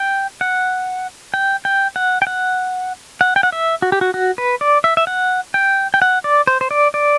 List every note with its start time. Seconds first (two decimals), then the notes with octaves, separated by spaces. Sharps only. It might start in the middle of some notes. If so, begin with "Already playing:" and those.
Already playing: G5
0.41 F#5
1.34 G5
1.65 G5
1.96 F#5
2.22 G5
2.27 F#5
3.21 F#5
3.36 G5
3.43 F#5
3.52 E5
3.82 F#4
3.92 G4
4.01 F#4
4.14 F#4
4.38 B4
4.61 D5
4.84 E5
4.97 E5
5.07 F#5
5.54 G5
5.94 G5
6.02 F#5
6.24 D5
6.47 C5
6.61 C5
6.71 D5
6.94 D5